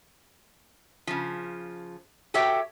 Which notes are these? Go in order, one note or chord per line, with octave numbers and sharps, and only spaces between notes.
C#3 F3
F#4 G4 A4 C#5 E5 G5